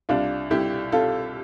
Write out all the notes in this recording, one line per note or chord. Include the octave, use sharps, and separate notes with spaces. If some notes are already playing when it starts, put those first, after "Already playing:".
C2 D4 F4
C2 E4 G4
C3 F4 A4